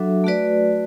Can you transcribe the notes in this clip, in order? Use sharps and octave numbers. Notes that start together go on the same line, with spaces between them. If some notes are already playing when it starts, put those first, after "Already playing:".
Already playing: F#3 D4 F#4 A4 E5
A3 F#4 B4 D5